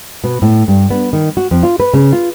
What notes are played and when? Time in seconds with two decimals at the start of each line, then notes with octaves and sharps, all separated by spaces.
0.24 B2
0.42 A2
0.68 G2
0.91 B3
1.13 D#3
1.37 F#4
1.51 F2
1.63 F4
1.80 B4
1.94 C#3
2.13 F4